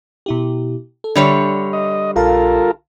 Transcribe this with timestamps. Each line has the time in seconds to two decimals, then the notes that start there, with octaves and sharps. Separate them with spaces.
0.26 B2 E4 G4
1.04 A4
1.15 D3 G3 C#5 D5 E5
1.73 D#5
2.16 A#1 F4 A4 A#4 F5 A5